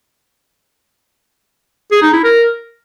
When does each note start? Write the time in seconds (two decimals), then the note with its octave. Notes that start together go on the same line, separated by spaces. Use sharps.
1.91 G#4
2.02 D#4
2.13 E4
2.24 A#4